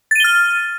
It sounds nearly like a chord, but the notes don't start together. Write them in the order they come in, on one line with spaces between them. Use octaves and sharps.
A6 D#7 G7 F6